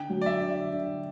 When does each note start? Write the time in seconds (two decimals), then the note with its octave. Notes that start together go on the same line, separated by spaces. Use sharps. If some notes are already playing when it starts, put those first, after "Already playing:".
Already playing: D3 G5
0.09 F#3
0.21 D5
0.26 E5
0.41 D3
0.72 D3